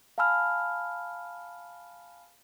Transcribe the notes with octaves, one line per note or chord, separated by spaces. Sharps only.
F5 G#5 A5 B5 E6 F6